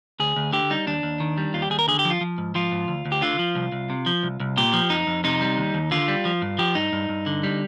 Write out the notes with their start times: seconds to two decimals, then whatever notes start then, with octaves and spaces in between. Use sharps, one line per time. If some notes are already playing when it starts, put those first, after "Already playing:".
0.20 D2 G#4
0.36 D2
0.53 D3 G4
0.70 G3 D#4
0.87 D#2 D4
1.03 D#2
1.20 D#3
1.38 G3
1.54 D#2 F4
1.62 G4
1.70 D#2 G#4
1.79 A#4
1.88 D3 G#4
1.99 G4
2.05 F3
2.10 F4
2.21 F3
2.38 G#2
2.55 F3 F4
2.72 G#2
2.88 D2
3.05 D2
3.12 G4
3.22 D3 F4
3.39 F3
3.55 C2
3.72 C2
3.90 C3
4.06 F3
4.23 C2
4.40 C2
4.57 A#2 G4
4.73 F3
4.90 F2 D#4
5.07 F2
5.24 C3 D#4
5.41 G3
5.57 D#2
5.74 D#2
5.91 D3 F4
6.08 G3
6.25 F3
6.42 G2
6.58 F3 G4
6.75 G2 D#4
6.93 G2
7.09 G2
7.26 D3
7.43 G3